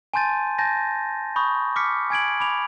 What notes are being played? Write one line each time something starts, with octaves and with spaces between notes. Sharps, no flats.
G#5 A5 C6 G6 A6 D#7
G#5 A5 G6 A6 A#6
B5 C#6 D#6 G6
D6 F6 B6 C#7
G#5 G#6 D7 F#7
B5 D6 F7